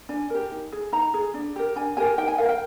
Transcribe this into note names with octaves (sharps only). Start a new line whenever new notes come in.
D4 G#5
G4 A#4
D#4
G#4
D#4 A#5
G#4
D4
G4 A#4
D4 G#5
G4 A#4 G#5
D#4 G5
G#5
A#4 F5
G5